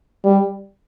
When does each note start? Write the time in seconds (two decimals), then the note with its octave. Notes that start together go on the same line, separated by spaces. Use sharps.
0.24 G3